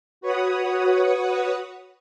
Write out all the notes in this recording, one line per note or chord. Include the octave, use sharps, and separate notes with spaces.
F#4 B4 C#5 F#5 D#6